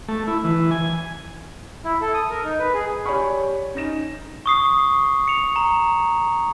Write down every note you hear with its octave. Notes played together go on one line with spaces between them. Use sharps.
A3
E4
E3
G#5
E4
A4
D#6
A#4
D#4
B4
G#4
G4 C#5 D5 G#5 B5 C#6
C#4 D#4 A#6 E7
C#6 D#6 C7
C#7 F7
A#5